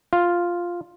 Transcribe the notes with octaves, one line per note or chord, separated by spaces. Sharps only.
F4